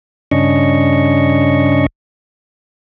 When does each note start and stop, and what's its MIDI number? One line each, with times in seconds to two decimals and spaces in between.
0.31 1.86 43
0.31 1.86 49
0.31 1.86 61
0.31 1.86 62
0.31 1.86 75
0.31 1.86 85